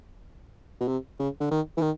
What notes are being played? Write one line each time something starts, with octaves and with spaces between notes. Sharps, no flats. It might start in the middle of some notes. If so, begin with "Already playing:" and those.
B2
C3
C#3
D3
D#3
E3
D#3